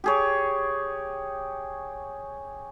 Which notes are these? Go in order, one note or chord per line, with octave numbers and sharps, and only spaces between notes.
G4 G#4 C#5